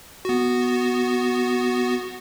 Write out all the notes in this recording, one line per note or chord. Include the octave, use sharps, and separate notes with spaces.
B3 F#4